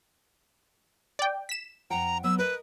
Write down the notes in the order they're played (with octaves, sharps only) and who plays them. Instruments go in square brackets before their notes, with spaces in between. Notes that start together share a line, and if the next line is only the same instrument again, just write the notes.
[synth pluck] D5 G5
B6 E7
[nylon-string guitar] F2 F#5 G5 [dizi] A#5
[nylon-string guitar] F#3 B3 [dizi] E6
[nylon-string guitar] A#4 D#5 [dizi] B4